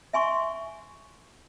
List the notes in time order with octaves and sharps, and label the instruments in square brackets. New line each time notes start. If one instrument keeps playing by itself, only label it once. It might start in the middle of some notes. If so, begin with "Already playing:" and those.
[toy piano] E5 G#5 C6 C#6